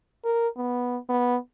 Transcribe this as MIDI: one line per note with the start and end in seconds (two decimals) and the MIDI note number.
0.25 0.48 70
0.57 0.97 59
1.09 1.36 59